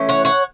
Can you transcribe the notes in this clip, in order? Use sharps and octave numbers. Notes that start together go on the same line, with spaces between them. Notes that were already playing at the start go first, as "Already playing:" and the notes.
Already playing: E3 A3 C#4
C#5 F#5
C#5 F#5